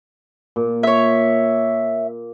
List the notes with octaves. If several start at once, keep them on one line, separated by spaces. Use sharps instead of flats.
A#2
C#5 E5